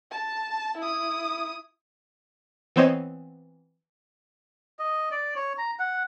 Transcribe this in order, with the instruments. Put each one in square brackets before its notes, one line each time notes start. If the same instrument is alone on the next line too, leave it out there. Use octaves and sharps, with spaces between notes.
[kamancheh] A5
E4 D#6
[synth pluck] E3 B3 C4 C5 C#5 D#5
[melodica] D#5
D5
C#5
A#5
F#5